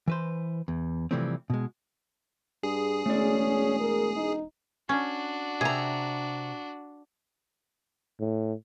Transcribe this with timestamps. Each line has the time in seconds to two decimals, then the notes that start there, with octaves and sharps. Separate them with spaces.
0.08 E3 B4 C5
0.68 E2
1.11 C3 E3 F3 G3 A3 C4
1.50 B2 G#3
2.63 G2 G#4
3.06 E1 A3 C#4 D5
3.80 A#4
4.16 D#4
4.89 C#4 D4 F#4
5.61 C3 G#4 A#5
8.20 A2